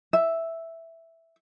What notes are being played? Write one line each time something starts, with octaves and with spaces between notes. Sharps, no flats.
E5